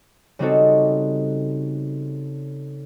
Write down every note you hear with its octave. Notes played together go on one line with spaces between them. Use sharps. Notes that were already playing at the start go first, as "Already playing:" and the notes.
C#3 G3 C4 D#4 F#4 A4